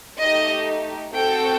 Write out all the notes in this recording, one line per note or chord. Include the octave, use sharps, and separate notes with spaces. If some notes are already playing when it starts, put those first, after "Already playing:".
A3 D#4 G4 D#5
C4 F#4 A4 G5